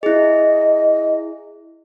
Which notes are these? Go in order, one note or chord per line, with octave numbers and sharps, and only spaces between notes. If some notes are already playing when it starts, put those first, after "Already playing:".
E4 G#4 D#5